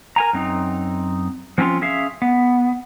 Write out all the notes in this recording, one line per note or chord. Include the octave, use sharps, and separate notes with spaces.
A#4 G#5 A#5
F#2 C4 D#4
F3 C4 C#4 E4 F4
C#4 G#4 E5 F5
B3